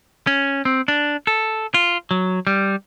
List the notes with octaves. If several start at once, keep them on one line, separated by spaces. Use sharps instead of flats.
C#4
C4
D4
A4
F4
F#3
G3